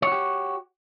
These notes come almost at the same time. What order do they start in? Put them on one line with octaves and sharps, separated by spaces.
C#5 F#4 G4